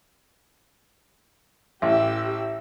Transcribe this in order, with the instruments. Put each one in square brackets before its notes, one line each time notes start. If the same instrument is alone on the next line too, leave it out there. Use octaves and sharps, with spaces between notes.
[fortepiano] A1 [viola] G4 E5